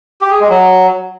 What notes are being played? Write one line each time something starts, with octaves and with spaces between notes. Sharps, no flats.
G4
G#4
G#3
F#3